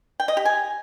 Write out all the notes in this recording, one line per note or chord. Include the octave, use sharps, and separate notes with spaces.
G5
D#5
G4
G#5